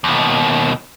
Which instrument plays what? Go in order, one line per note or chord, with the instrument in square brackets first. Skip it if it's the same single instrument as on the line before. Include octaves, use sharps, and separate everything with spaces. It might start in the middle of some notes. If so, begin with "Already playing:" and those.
[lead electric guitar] D#2 B2